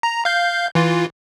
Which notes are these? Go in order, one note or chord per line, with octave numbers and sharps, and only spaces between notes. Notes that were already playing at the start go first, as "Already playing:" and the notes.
A#5
F5 G6
E3 F4